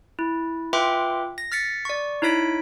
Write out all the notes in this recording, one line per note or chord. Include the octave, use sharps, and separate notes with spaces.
E4
F4 B4 E5 G5 C6 D6
A#6
F6 A6 B6 C#7
D5 C#6
D#4 E4 C#5 B6 D7